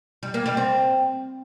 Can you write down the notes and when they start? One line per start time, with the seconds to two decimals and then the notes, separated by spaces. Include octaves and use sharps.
0.23 G3
0.34 A#3
0.46 G3
0.57 C4